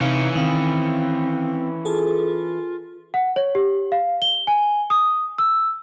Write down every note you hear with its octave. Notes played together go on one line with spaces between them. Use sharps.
C3 E3 C#4 D#4 F5
D#3 C4 F5
F4 G#4 A4
F#5
C#5
G4
F5
G7
G#5
D#6
E6